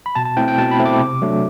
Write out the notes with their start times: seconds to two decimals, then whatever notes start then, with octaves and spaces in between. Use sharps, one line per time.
0.06 B5
0.15 B2 A5
0.25 A5
0.37 A3 C4 E4 G5
0.48 G5
0.58 B2 A5
0.71 B5
0.79 A3 C4 E4
0.86 D6
1.00 C3
1.22 F#3 A3 D4